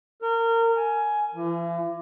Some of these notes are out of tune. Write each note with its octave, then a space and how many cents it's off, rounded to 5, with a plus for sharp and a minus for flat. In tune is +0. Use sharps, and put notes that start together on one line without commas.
A#4 -25
G#5 +15
E3 +45